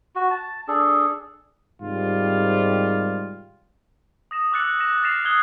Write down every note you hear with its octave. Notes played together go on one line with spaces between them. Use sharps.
F#4
A5
D4 G#4 A4
G#2 C3 D#3 G3 F4
D#6 A#6 E7
D6 E6 F#6 A6 C#7 F#7
A#6 E7
F6 A6 A#6 C7 E7 F7
D#6 F#6 G#6 G7